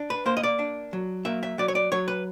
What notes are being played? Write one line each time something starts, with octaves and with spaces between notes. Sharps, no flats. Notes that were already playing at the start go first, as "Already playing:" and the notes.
Already playing: D4
B4
A#3 C5
D#5
D5
D4
F#3
A#3 E5
E5
F#3 D5
C#5
D5
F#3 C#5
B4